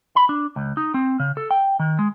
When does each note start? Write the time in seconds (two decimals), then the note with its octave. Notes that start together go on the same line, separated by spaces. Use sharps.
0.16 B5
0.29 D4
0.56 C#2
0.77 D#4
0.94 C4
1.20 C#3
1.37 A4
1.51 G5
1.79 D#3
1.99 G#3